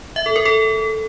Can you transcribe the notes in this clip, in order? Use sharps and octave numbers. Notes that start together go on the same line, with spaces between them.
E5
A4
A#4
A4